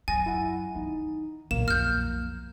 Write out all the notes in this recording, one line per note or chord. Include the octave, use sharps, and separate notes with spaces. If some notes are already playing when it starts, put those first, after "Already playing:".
F#3 G#5 A6 A#6
F#2 E4 F#5
D#3 D#4
B1 A#2 C#3 A#3 E7
F2 F6 G6